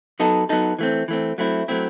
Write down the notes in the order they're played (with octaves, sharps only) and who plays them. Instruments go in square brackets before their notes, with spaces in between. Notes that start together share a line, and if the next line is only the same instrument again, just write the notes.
[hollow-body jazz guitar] F#3 B3 D#4 A4
F#3 B3 D#4 A4
E3 A3 C4
E3 A3 C4
F#3 A3 C4 E4
F#3 A3 C4 E4